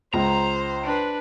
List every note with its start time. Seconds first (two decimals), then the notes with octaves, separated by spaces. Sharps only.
0.14 C#2 C5 A#5
0.84 D4 B4